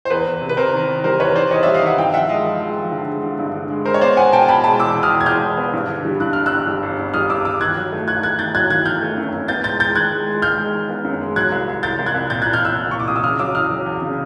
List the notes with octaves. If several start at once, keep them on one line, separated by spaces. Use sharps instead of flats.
C5
E2 B4
E2
C3
B4
C3 A#4 C5
D#3
D#3
G3 A#4 C5
E2 B4 C#5
D#3 C5 D5
E2 C#5 D#5
D5 E5
G3
D#5 F5
D#3 E5 F#5
G2 F5 G5
F3 E5 F#5
G#3 D#5 F5
F3
G#3
F3
D3
G#3
D3
G2
D3
G#3
G#3 A#4 C5
C#5
B3 C5 D5
B3 F#5 G#5
B2 G5 A5
B2 A5 B5
G#3 A5 B5
E2 D6 E6
B2
D#6 F6
E2
G#6
G#3 F6 G6
E2
B3
G2
D3
G3
G2 F#6
G1 F6
E6 F#6
G1
G3
G1
G2
G3 D#6 F6
G2 D6 E6
G1 D6 E6
D#3 F#6 G#6
F#3
A3
F#3 F#6 G#6
A3 F#6 G#6
D#3 G6 A6
F#3 F#6 G#6
D#3 F#6 G#6
D#3 F6 G6
A3
F#2
F#2
B3 G6 A6
G#3 G6 A6
G#3 G6 A6
D#3 F#6 G#6
G#3
G#3
G#3 F6 G6
G#3
D#3
B3
F#2
G#3
F#3 F#6 G#6
C2
C2
C2 G6 A6
C2
F#6 G#6
C2
A#2 G6 A6
F#6 G#6
A#2
F6 G6
A#2 E6 F#6
C2
A#2 C#6
D6
C2 D#6
E6
C#3 D#6 F6
F#3 D6 E6
E2 D#6 F6
F#3
E2
C#3